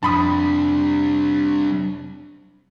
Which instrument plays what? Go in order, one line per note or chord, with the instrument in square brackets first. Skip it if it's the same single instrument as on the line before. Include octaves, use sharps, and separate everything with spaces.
[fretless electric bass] F2 [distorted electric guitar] C3 G3 [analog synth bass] D4 [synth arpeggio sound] A5 B5 D#6